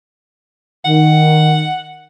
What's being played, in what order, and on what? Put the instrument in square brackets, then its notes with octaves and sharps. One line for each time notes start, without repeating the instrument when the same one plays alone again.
[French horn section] D#3 [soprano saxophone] F#5